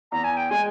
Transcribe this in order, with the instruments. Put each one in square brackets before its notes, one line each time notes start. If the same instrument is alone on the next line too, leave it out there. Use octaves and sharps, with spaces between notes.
[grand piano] E2 [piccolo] A#5
[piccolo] G#5
G5
[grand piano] G#3 [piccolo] G#5